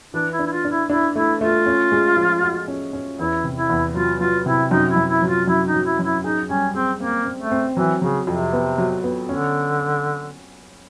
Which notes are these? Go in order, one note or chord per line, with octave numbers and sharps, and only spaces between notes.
E3 D4
E4
D4
E4
F4
D4
E4
D4 E4
A3 E4
A3 F4
C#4
G#3
F3
F#4
C#4
C#4
E2 E4
C3
E4
E2
F#3 F4
F#3 F4
C3 E4
F#2 D#4
E4
F#2
E4
F#3
F4
F#2 E4
D#4
F#3
E4
F#2
E4
D#4 G#4
G3 C#4
C4 G#4
A#3 C4
C4
A3
C4
E3 F#3
C#3 F#3
F2 C3
B3
F#3
B3
D3 C#4